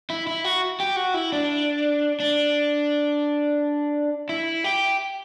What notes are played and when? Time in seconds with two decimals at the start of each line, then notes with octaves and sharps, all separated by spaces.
0.10 E4
0.27 E4
0.44 F#4
0.80 G4
0.96 F#4
1.14 E4
1.32 D4
2.20 D4
4.29 E4
4.64 G4